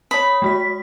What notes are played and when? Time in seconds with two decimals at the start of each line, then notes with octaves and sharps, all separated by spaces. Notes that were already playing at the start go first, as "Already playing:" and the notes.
0.11 C#5 B5 D#6
0.42 G#3 F#4 B6